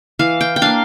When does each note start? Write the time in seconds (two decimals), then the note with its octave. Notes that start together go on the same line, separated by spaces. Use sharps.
0.19 E3 F5
0.41 G5
0.56 G5
0.62 A#3 D4 F5